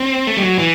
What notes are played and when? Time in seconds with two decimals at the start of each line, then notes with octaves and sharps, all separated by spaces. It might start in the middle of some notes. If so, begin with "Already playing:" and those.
Already playing: C4
0.27 A3
0.37 G3
0.43 F#3
0.59 E3